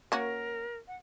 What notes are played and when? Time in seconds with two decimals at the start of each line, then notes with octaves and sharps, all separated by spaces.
0.12 A#3 C#4 F#4 A#4
0.88 F#5